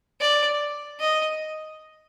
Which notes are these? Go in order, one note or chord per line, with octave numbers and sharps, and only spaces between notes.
D5
D#5